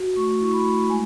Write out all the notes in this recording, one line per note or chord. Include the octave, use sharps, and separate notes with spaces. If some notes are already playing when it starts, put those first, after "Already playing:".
Already playing: F#4
A3 C#6
E4 C#6
B5
A3
G#3 G#5